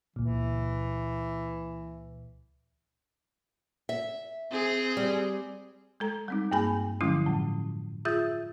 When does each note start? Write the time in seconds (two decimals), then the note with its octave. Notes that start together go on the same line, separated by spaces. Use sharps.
0.16 C#2 A#2 E3
3.89 E5
4.51 C4 G#4
4.97 G3
6.00 G#3 A4 A#5
6.28 G3 C4 D#4
6.52 G2 A#3 G#4 G#5 B5
7.01 D3 F3 F#3 G#3 C#4 E4
7.26 F#2 A2
8.05 F4 G#4 E5 D#6 G6 A6